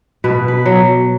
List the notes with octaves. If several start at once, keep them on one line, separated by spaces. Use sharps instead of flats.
B2 B4
B4
F#3